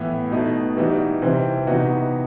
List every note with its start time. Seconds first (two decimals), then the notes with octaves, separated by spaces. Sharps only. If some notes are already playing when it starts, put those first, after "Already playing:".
Already playing: A2 E3 B3
0.32 B2 A3 D#4
0.77 E3 G3 D#4 F#4
1.22 C3 E3 G3 C4
1.67 C3 E3 B3 D#4 F#4